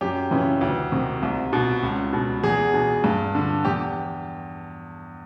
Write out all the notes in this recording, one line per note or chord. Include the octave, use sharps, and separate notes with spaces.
F#2 G4
C#3 E3
D2
C3 D#3
C2
B2
C#2
B2
E2 G#4
B2
G2
D3
E2 G4